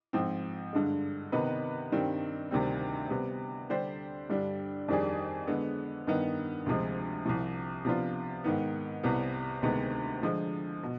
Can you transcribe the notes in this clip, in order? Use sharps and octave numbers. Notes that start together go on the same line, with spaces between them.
G#2 F3 C4
G2 D3 G#3
C3 D#3 B3 D#4 B4
G2 D#3 G3 C4
D2 C3 D#3 G3 C4
C3 G3 B3
D3 G3 D4 G4 C5
G2 D3 G3 D4
F2 D#3 G3 D4 G#4
D3 G#3 B3
G2 D#3 B3 D#4
D2 C3 F3 G#3
C2 C3 F3
C3 F3 B3 D4 F4
G#2 D#3 B3
C2 C3 G3 B3
D2 C3 D#3 G#3 B3
D3 F3 G#3
B2